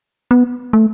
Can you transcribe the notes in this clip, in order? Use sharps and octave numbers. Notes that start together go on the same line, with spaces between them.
B3
A3